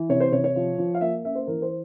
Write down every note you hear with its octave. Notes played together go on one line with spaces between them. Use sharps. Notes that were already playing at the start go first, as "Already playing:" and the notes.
Already playing: E3
C3 C#5
C5
C3 C#5
C#5
F3
F3
F5
A#3 E5
C#4 E5
C5
E3 A#4
C5